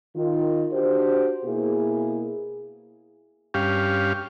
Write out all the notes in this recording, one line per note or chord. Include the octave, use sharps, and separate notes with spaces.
D#3 F4
D4 F#4 G4 C5
B2 A#3 E4 G#4
G2 C#4 G4 F5